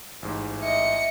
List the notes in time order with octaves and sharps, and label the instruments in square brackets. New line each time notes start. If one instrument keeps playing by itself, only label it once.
[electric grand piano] A1 G#2
[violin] D#5 C#7 [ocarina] E5